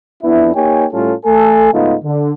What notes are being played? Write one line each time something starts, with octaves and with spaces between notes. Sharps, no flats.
F2 B3 D4 E4
A#3 D#4 G4 C#5 G5 G#5
A2 G3 C#4 F4 A4
A3 A4 G#5
G#2 C#3 A3 B3 D#4 F4
D3